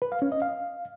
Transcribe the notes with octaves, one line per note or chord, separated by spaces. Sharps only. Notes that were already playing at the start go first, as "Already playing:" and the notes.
B4
F5
C#4
D#5
F5